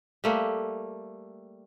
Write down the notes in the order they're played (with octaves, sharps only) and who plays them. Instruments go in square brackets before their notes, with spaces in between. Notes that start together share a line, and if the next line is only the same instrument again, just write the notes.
[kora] G3 A3 A#3